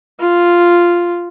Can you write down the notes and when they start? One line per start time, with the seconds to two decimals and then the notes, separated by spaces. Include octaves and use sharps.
0.20 F4